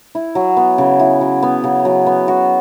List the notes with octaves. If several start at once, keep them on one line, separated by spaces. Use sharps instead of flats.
E4
F#3
B3
C#3
E4
F#3
B3
C#3
F#3
B3
F#4